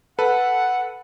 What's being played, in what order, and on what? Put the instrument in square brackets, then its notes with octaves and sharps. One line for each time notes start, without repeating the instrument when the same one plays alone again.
[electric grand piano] A4 B4 [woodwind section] F#5